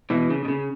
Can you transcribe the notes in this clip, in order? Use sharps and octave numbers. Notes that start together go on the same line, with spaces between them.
B2 E3
C#3
B2
C#3